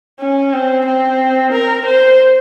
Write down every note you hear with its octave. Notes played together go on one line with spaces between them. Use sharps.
C#4
C4
C4
A#4
C5